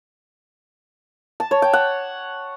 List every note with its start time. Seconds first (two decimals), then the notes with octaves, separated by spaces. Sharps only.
1.40 A5
1.51 C#5
1.62 G5
1.73 F#5